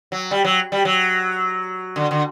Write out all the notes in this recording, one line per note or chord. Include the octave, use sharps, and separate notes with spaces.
F#3
G3
F#3
G3
F#3
D3
D3